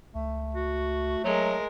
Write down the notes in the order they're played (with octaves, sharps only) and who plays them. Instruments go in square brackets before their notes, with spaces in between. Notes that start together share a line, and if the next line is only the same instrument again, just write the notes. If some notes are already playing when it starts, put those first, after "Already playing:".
[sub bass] C#2 [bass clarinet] A3
[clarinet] F#4
[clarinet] F#3 [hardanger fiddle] G#3 A#4